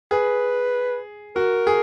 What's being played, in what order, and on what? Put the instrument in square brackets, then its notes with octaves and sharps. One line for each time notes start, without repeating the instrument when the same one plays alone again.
[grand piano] G#4 [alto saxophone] B4
[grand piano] F#4 [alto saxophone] A#4
[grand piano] G#4